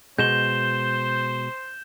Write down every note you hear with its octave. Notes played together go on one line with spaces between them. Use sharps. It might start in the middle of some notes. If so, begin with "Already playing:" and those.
B2 G#3 C5 G6 E7 G7